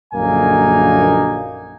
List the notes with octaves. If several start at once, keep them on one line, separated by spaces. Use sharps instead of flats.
A#1 F#2 D3 A#3 D#4 G#5